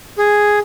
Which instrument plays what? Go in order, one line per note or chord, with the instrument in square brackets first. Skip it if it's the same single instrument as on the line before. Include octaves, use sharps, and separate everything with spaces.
[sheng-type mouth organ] G#4